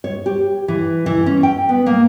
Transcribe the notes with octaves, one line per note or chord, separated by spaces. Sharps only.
C#5
G4
E3
E3
C#4
G5
B3
A#3